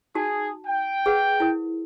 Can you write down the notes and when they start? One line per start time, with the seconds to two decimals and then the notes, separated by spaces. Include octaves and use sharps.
0.15 D#4 F#4 G#4 A5
0.67 G5
1.06 G#4 B4 F#5
1.40 E4 A#4